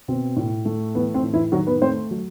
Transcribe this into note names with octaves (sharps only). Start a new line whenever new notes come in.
B2 C4
A2
A3
E3 B3
C4
A2
E3 E4
D#3 F#3 F#4
B3 B4
A3 C4 C5
F#3